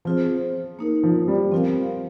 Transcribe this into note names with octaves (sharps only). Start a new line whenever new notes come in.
F3 C4 F4 G#4 C5
A#3 D#4 A#4
F3
G3
F3 C4 F4 A#4 F5